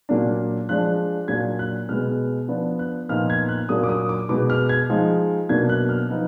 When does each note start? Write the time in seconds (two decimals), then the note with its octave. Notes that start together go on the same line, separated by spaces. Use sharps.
0.09 A#2 F#3 A#3 D4
0.69 F3 G#3 D4 F#6
1.28 A#2 F#3 D4 G#6
1.59 F#6
1.89 B2 G#3 B3 F6
2.48 F3 B3 D4
2.79 F#6
3.09 A#2 F3 B3 D#4 F6
3.30 G#6
3.49 F#6
3.69 A#2 F#3 A#3 D4 D#6
3.84 D6
3.89 D#6
4.09 D6
4.29 B2 G#3 B3 D6
4.50 F6
4.69 G#6
4.89 F3 G#3 D#4
5.49 B2 F#3 A#3 D4 G#6
5.69 F#6
5.89 F6
6.10 F3 B3 D#4